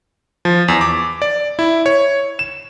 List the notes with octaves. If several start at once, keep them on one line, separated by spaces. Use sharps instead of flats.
F3
E2
D6
D5
E4
C#5
E7